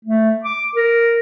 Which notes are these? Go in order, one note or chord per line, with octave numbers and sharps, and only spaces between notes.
A3
D6
A#4